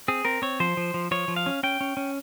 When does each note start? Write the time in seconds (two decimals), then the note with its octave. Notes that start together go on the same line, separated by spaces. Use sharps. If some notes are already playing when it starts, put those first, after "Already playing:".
0.08 C4 G#4
0.25 C4 A#4
0.42 C4 C#5
0.60 F3 C5
0.77 F3
0.94 F3
1.11 F3 C#5
1.28 F3
1.36 F5
1.46 C#4
1.63 C#4 G5
1.81 C#4
1.97 C#4